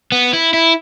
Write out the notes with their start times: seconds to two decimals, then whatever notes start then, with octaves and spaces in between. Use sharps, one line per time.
0.12 B3
0.33 E4
0.54 E4